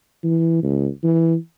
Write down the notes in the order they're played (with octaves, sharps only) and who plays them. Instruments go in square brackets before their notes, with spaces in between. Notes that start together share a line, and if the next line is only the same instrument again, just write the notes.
[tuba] E3
C#2
E3